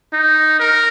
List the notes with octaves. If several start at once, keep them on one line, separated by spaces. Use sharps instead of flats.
D#4
A#4